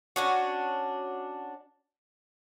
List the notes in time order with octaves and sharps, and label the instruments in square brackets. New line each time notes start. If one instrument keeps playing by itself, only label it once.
[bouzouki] C#4 D4 F#4